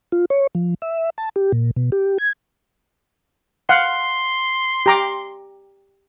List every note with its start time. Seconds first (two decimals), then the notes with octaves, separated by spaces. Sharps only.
0.12 F4
0.30 C#5
0.55 F3
0.82 E5
1.18 A5
1.36 G4
1.52 A#2
1.76 B2
1.92 G4
2.18 G#6
3.69 F5 F#5 C6
4.86 G4 A#5 D6